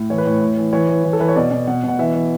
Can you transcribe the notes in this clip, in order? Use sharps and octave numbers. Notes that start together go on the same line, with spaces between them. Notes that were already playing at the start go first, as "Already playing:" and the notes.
Already playing: A2
E3 C#5
B4
A2 C#5
A2
E3
E3 C#5
E3
E3
A4
E3 B4
C#5
B2 D5
B2
B2 F#5
B2
F#5
E3 E5
E3